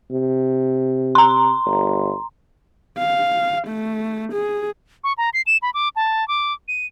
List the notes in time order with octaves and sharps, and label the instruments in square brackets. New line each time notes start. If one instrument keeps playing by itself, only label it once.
[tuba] C3
[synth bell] A#5 C6
[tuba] G1
[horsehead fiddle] F5
A3
G#4
[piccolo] C#6
A#5
C7
E7
B5
D6
A5
D6
D#7